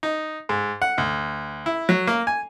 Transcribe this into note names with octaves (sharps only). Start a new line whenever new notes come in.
D#4
G#2
F#5
D2
E4
F#3
A#3
G#5